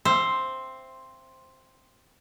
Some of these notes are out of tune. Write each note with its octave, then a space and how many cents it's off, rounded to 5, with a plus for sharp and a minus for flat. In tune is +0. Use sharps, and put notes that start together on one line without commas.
C4 +0 C5 +5 E5 +40